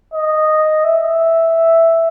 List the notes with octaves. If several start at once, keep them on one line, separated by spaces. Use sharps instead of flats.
D#5
E5